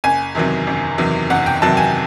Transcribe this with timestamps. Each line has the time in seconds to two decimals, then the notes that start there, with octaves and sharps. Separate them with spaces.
0.04 F#1 G#5
0.35 E2 C3 D#3 F#3
0.67 F#1
0.98 E2 C3 D#3 F#3
1.30 F#1 F#5
1.46 G5
1.62 E2 C3 D#3 F#3 A5
1.77 G#5